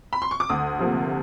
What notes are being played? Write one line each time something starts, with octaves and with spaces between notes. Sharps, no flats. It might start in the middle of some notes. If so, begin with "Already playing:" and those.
B5
C6
C#6
D6
D2 D#6
C3 F3 A#3